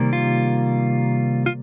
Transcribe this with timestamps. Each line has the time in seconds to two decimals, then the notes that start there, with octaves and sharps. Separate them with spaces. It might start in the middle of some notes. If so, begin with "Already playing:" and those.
Already playing: C3 D#3 G3 A#3
0.13 F4
1.46 F4